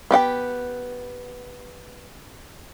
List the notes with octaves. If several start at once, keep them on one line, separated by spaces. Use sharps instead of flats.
B3 G4 F#5 G5